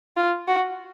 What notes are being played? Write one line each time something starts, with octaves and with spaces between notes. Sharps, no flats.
F4
F#4